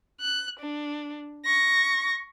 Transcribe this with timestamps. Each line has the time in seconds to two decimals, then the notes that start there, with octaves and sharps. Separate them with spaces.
0.21 F#6
0.59 D4
1.45 C#6 A#6